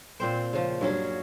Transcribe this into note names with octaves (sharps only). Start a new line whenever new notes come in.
A#2 C4 C5
C#3 F3
G2 F#3 C#4 G#4